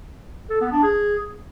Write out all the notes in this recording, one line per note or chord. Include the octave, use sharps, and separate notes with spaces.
A4
B3
D4
G#4